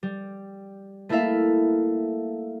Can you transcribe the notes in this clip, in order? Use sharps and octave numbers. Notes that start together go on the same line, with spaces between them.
G3
A3 A#3 E4 A4 E5 F5